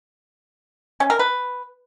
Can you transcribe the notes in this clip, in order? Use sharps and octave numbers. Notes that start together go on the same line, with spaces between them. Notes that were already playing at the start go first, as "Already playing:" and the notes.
C#4
A#4
B4